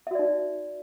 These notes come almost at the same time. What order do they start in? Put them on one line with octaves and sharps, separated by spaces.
E5 F#4 D5 D#4